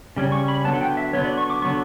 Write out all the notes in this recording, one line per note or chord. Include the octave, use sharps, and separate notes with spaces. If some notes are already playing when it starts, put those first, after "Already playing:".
C#3 G3 C#4
C#6
B5
D3 F#3 B3 A5
F#5
G5
E5
D3 F#3 B3 C#5
D5
C#6
D6
D3 F#3 B3 C#6